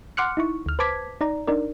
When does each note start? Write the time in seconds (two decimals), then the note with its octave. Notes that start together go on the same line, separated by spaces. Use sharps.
0.17 F#5 C6 D6 F6 F#6 C#7
0.37 D#4 E4 C#6
0.66 D2 F6
0.79 B4 C5 A5 D6 G#6 B6
1.21 D#4 D5 A#5
1.47 D4 D#4 A#4 D5